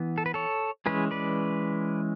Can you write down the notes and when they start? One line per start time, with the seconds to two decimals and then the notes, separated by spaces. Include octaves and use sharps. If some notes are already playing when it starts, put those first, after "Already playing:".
Already playing: E3 B3
0.18 A4
0.26 B4
0.34 A4 C#5
0.86 E3 G#3 C#4 G#4 B4
1.11 B4 D5